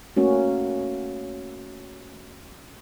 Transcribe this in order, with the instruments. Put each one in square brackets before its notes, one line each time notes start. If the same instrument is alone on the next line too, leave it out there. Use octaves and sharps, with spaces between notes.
[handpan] A3 A#3 C#4 F#4